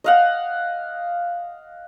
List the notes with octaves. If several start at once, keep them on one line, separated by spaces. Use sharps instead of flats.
D#5 F5 F#5